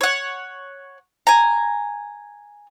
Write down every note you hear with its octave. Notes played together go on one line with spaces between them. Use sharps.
C#5 F#5
G#5 A#5